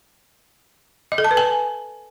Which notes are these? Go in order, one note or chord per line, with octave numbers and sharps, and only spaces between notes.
D#5
A4
A5
B4
G#5